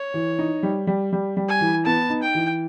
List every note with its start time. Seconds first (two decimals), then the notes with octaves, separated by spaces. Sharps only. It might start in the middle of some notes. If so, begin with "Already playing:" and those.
Already playing: C#5
0.14 E3
0.39 D#4
0.63 G3
0.87 G3
1.13 G3
1.37 G3
1.49 G#5
1.61 E3
1.85 B3 A5
2.10 D#4
2.22 G5
2.35 E3